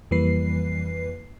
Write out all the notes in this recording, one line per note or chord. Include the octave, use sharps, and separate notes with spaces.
F2 E3 G3 A#3 B4 C7